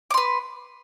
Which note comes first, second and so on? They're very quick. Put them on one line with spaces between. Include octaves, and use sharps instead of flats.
D6 C6 B4